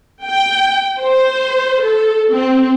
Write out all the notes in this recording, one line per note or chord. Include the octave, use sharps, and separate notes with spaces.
G5
C5
A4
C4